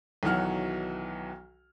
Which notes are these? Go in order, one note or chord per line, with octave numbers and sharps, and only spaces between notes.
B1 D#3 E3 F#3 F#5 F6